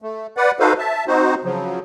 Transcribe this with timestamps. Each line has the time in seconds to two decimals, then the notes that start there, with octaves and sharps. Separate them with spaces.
0.02 A3
0.37 B4 D5 F#5
0.60 D#4 F#4 A4 B4 C5 F5
0.79 E5 A5
1.07 C4 D#4 F#4 C5
1.44 C#3 F3 F#3